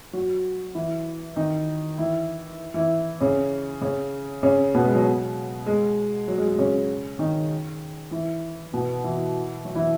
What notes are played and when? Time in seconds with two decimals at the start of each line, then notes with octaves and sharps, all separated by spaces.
0.13 F#3 F#4
0.75 E3 E4
1.36 D#3 D#4
1.98 E3 E4
2.74 E3 E4
3.20 C#3 C#4
3.81 C#3 C#4
4.43 C#3 C#4
4.74 B2 B3
4.84 G#3
4.95 F#3
5.66 G#3
6.28 F#3
6.38 G#3
6.48 G#3
6.58 C#3 C#4
7.19 D#3 D#4
8.11 E3 E4
8.73 B2 B3
9.04 E3 E4
9.65 F#3 F#4
9.75 E3 E4